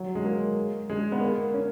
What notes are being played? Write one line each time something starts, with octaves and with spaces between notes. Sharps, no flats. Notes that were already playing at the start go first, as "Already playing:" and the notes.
Already playing: F#3
G#3
A#3
G#3
B3
A#3
C#4